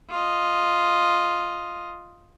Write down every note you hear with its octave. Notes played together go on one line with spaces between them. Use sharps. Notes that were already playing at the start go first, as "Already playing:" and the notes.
F4 D#5